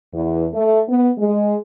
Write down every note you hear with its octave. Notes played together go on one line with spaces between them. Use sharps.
E2
A3
B3
G#3